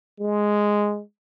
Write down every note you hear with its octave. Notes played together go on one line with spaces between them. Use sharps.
G#3